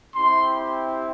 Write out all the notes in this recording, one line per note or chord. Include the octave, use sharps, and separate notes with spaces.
C4 E4 G4 C6